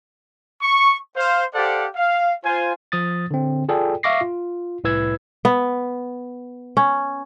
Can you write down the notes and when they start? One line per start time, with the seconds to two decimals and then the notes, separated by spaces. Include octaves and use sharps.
0.63 C#6
1.16 C5 F5
1.55 G4 A4 C5 D5 F5 F#5
1.96 F5
2.45 F4 C5 G#5
2.92 F3 D#6 A6
3.31 D3 C4
3.69 F4 G#4 A4 D5 G5
4.03 E5 F5 C#6 D6 A#6 C7
4.21 F4
4.84 C2 A2 E4 B4 E6 G#6
5.45 B3
6.77 C#4